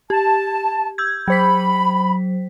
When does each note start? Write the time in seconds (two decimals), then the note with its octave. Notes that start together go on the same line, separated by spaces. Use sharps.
0.10 G4 A5
0.98 E6 G6 G#6
1.28 F#3 C5 B5 B6